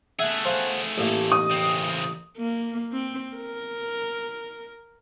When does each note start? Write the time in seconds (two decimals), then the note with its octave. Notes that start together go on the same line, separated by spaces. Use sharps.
0.19 A3 G#4 E5 F#5 G#5
0.45 C5 F5 F#5
0.98 A1 A#3
1.32 D#6
1.51 C#3 C4
2.38 A#3
2.92 C4
3.36 A#4